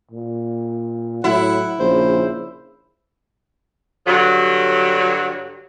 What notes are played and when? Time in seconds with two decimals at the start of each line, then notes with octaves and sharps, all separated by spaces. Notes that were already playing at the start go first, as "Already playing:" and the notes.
0.11 A#2
1.24 A2 F#3 E4 F#5
1.80 A#1 C#3 C5
4.07 G2 D3 F#3